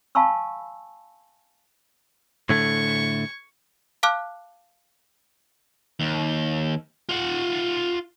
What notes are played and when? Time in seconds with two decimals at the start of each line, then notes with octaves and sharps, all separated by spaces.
0.15 F5 G#5 A5 B5 C#6 E6
2.49 A2 D3 A3 C#6 G#6
4.03 F5 A5 D6 F6 F#6
6.00 D#2
7.09 F4 F#5